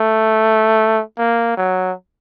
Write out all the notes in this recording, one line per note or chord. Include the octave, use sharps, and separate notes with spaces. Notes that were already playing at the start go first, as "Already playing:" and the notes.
Already playing: A3
A#3
F#3